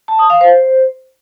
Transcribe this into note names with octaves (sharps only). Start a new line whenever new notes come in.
A5
D#6
F5
C5